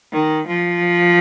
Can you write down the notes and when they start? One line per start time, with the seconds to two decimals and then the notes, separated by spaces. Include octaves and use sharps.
0.13 D#3
0.47 F3